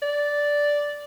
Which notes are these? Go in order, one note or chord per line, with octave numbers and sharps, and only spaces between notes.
D5